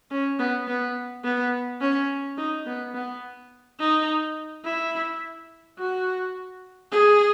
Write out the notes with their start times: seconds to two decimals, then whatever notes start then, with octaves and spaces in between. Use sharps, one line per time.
0.11 C#4
0.39 B3
0.67 B3
1.24 B3
1.81 C#4
2.38 D#4
2.66 B3
2.94 B3
3.80 D#4
4.65 E4
5.78 F#4
6.92 G#4